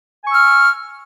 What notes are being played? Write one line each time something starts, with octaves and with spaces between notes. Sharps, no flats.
G#5 C#6 E6 F6